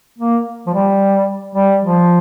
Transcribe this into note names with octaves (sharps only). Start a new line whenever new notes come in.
A#3
F3
G3
G3
F3